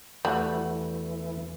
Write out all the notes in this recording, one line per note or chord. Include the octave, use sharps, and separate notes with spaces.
E2 E3 G3 A3 F#4 F#5